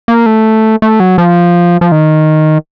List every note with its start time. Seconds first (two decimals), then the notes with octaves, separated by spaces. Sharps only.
0.08 A#3
0.26 A3
0.82 A3
1.00 F#3
1.18 F3
1.81 F3
1.92 D#3